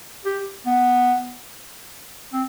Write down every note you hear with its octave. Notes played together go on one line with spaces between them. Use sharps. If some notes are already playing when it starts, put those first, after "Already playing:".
G4
B3
C4